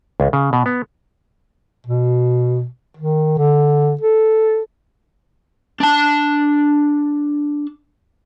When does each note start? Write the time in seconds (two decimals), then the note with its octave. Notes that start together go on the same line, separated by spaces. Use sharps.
0.20 C#2
0.33 C#3
0.53 B2
0.66 B3
1.87 B2
2.97 D#3
3.38 D3
4.01 A4
5.80 D4 A5